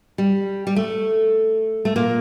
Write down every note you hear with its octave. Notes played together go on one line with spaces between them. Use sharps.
G3
G3
A3
A3
A#2 A#3